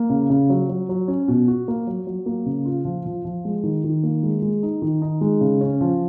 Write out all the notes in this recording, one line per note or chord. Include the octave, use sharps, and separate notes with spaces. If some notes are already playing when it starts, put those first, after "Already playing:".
Already playing: A#3
C#3
C#3
F#3
F#3
F#3
C#4
B2
F#4
A#3
F#3
F#3
A#3
C#3
F4
F3
F3
F3
G#3
D#3
D#3
A#3
G#3
G#3
D#4
D#3
D#4
G#3
C#3
C#4
F3